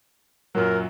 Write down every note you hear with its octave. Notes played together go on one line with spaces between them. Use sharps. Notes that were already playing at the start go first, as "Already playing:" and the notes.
F#2 A#2 F#3 A#4